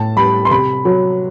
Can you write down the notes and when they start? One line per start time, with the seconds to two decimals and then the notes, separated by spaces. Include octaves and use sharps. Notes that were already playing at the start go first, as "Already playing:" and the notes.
Already playing: A2 A5
0.16 G3 B5
0.45 C6
0.51 C3 B5
0.85 F#3